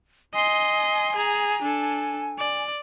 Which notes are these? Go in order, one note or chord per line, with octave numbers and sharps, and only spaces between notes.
D#5 G#5 C6
G#4 A#5
D4 A4
D5